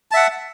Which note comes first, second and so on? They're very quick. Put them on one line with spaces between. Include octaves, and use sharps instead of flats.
A5 E5 F#5